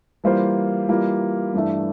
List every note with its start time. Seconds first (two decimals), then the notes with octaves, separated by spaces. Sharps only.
0.24 E3 G3 A#3 F4 C5
0.89 E3 G3 A#3 F4
1.54 G2 E3 A3 D4